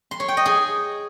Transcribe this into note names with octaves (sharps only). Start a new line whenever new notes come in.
C6
C#5
G5
D#5
G#4